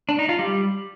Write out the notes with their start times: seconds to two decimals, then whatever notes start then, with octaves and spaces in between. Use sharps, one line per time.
0.09 D4
0.19 D#4
0.29 F4
0.39 G3